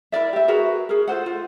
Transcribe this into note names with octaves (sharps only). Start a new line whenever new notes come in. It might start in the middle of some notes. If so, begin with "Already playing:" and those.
E4 A#4 D5 E5
G4 E5
F#4 G#4 A#4 B4
G#4 A#4
F4 A4 C5 F#5
F4